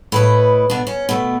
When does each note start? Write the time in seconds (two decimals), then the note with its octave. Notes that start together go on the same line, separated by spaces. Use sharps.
0.12 A2 B4 D#5
0.70 B2 D4
0.87 C#4
1.09 B2 A3